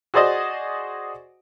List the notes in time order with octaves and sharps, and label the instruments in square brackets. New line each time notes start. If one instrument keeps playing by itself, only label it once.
[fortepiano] F#4 G#4 C5 D5 D#5